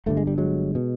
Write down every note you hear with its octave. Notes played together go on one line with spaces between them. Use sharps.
G1 G2 D3 A3
G#3
G3
F#3 G#3
B2